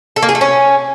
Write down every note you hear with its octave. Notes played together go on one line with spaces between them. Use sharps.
A4
A#3
G#4
A3
C#4